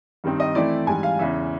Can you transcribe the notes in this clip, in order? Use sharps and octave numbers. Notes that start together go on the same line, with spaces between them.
G2 D#3 G3 C4 D#4
D#5
E3 A3 C4 E4 D5
G#2 E3 G3 G#5
F5
E2 C#3 E3 E5